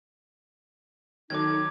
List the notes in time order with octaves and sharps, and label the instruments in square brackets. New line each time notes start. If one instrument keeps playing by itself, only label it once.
[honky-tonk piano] D#3 F#3 A4 [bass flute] D#4 [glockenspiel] D6 G#6